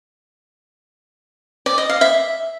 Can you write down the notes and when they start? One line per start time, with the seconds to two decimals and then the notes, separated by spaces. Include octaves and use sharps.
1.66 D5
1.78 D#5
1.89 F5
2.01 E5